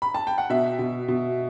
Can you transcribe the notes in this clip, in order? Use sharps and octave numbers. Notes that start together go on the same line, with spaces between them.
B5
A5
G5
F#5
B2 E5
B2
B2